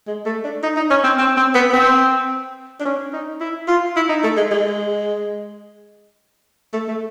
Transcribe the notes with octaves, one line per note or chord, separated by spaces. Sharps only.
G#3
A3
D4
D#4
D#4
C#4
C4
C4
C4
B3
B3
C4
D4
C#4
D#4
E4
F4
E4
D#4
A3
G#3
G#3
A3
A3